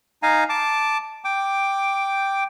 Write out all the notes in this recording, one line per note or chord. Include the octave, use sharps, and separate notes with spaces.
D#4 F5 G#5 A#5
A5 D6
G5 D6